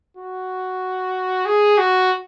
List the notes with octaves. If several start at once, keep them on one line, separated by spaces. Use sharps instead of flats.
F#4
G#4
F#4